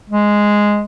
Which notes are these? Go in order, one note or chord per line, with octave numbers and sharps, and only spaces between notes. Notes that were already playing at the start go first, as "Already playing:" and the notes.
G#3